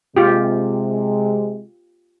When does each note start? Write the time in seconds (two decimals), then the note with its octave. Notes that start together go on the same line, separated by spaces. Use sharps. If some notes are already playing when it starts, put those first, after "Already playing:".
0.17 C3 G#3 F4 G4